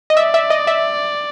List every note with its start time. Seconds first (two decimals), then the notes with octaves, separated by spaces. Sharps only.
0.10 D#5
0.17 D5 E5
0.34 E5
0.50 D#5
0.67 E5